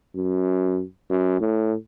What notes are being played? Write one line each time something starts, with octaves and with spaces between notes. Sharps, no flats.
F#2
F#2
A2